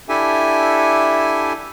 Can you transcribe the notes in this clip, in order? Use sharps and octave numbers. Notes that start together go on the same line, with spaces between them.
D4 E4 G4 A4 E5 G#5